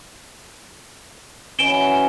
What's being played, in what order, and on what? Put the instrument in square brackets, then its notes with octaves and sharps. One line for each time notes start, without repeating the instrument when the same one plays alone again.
[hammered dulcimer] E3 C#4 F#4 [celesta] D7 E7 G7